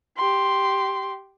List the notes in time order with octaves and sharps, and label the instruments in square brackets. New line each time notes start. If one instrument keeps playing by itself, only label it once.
[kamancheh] G4 C6